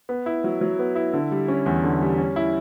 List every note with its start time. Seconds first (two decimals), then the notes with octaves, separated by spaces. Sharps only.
0.09 B3
0.26 E4
0.44 F#3
0.61 F#3
0.79 B3
0.96 E4
1.13 D3
1.32 G3
1.48 C#4
1.66 E2
1.84 D3
2.01 G3
2.18 C#4
2.36 E4